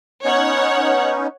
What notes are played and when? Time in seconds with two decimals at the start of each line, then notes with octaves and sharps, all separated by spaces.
0.25 B3 C#4 D#4 C#5 F#5